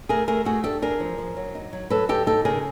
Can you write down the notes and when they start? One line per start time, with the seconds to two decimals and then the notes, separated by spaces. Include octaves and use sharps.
0.09 A3 G#4 A#4
0.28 A3 G#4 A#4
0.45 A3 F#4 G#4
0.64 D4 G4 A4
0.82 D4 G#4 A#4
1.00 F3
1.18 F3
1.37 F#3
1.55 D#4
1.73 F#3
1.90 F#3 A4 B4
2.09 D#4 G4 A4
2.27 D#4 G4 A4
2.45 C#3 G#4 A#4